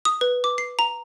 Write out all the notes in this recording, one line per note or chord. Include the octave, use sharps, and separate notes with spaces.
D#6
B4
D6
C7
A#5